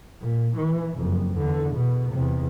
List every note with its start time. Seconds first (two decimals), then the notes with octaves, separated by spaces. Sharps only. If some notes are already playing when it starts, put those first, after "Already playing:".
0.21 A#2
0.56 E3
0.97 F#1 F2
1.36 E2 D3
1.75 B2
2.13 E2 C3